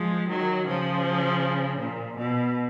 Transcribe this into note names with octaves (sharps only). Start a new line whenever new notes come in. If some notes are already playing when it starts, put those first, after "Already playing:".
Already playing: F3 G#3
D#3 F#3
C#3 F3
A#2
B2